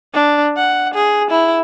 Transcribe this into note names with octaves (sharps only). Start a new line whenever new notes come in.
D4
F#5
G#4
E4